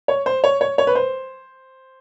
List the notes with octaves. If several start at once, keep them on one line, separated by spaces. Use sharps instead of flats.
C#5
C5
C#5
C#5
C#5
B4
C5